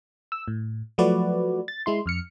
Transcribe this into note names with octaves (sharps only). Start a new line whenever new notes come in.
E6
A2
F3 F#3 A3 F#4 B4 D5
A6
G#3 E4 C6
F2 F6 C#7